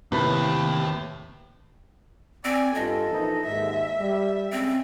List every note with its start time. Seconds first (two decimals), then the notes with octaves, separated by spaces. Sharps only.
0.12 D#2 A2 C3 B4 B5
2.45 C4 D5 G#5
2.75 G2 F4 A4 D#5
3.07 A#1 E3 D#4
3.46 D#2 G#2 E5
3.99 G3
4.52 C#3 G#3 C4